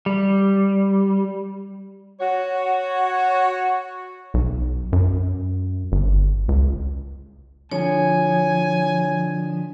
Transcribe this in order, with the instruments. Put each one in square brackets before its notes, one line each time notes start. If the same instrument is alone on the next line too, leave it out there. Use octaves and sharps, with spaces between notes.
[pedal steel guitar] G3
[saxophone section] F#4 C#5
[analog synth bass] B1
F#2
G1
C#2
[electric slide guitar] D3 F3 [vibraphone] C#5 [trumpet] G#5